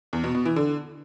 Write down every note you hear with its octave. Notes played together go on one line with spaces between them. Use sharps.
E2
B2
B2
E3
D3